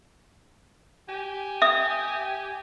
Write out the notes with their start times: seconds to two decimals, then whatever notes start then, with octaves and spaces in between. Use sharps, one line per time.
1.08 G4 G#5
1.62 E5 D#6